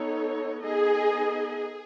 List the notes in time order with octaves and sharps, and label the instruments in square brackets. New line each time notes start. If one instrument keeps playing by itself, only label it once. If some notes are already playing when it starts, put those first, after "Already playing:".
Already playing: [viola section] B3 D#4 A4 C#5
[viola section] B3 D#4 A4 D#5 [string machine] G#4